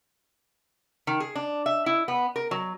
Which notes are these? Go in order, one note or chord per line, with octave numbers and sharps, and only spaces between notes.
D#3
G#4
D4
E5
E4
B3
A#4
F#3